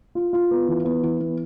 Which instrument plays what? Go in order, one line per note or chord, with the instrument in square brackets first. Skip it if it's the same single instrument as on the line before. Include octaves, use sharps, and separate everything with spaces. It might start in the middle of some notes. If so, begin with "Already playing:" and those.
[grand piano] F4
F4
B3
E3
B3
E3
B3